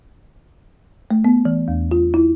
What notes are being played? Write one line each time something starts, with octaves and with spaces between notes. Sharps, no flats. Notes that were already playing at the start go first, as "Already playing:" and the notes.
A3
B3
E3
E2
F4
E4